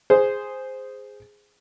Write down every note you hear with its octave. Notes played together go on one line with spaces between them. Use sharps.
G#4 C5